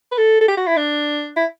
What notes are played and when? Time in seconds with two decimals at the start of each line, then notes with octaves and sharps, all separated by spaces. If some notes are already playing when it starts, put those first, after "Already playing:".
0.11 B4
0.18 A4
0.41 A4
0.48 G4
0.57 F#4
0.67 E4
0.76 D4
1.36 E4